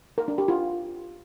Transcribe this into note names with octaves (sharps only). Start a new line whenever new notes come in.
A#4
D4
G4
F4